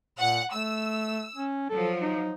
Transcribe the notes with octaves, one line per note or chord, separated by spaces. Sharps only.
A#2 F#5
A3 E6
C#4
F3 F#3 A4
D#4